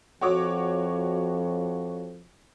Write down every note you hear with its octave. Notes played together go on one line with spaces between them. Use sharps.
F2 F#4 C#5 D6